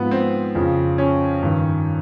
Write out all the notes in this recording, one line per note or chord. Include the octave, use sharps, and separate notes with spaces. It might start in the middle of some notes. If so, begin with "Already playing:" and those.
Already playing: G#2 F3 B3
C4
F2 C#3 F3
C#4
G2 D#3